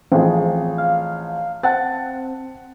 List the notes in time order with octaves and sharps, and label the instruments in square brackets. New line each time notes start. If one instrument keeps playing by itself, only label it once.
[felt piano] A1 F3 G#4 [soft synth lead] C4
[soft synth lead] F5
[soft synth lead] C4 [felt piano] F#5 A5 A6